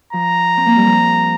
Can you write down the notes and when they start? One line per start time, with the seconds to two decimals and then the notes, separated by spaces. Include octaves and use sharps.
0.13 F3 A#5
0.57 C4
0.66 A#3
0.76 G3
0.86 F3